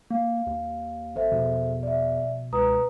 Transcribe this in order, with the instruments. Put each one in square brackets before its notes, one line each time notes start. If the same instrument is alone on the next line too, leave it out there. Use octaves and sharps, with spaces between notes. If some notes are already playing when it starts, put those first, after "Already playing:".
[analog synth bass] A#3 [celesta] F5
[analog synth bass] D#2
[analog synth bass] G#1 [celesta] A4 C5 E5
[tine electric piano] A#1 B2 [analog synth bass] E2
[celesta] D5 E5
[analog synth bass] C#2 [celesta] B4 A#5 D#6